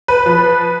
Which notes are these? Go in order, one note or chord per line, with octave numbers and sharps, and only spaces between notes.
B4
F3